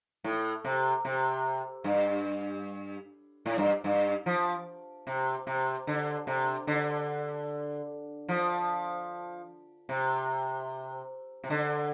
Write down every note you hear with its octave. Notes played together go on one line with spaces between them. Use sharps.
A2
C3
C3
G2
A2
G2
G2
F3
C3
C3
D3
C3
D3
F3
C3
C3
D3